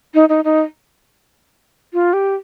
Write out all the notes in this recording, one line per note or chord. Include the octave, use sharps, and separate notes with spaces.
D#4
D#4
D#4
F4
G4